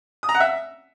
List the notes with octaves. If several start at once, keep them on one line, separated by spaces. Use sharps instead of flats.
D#6
A#5
F#5
E5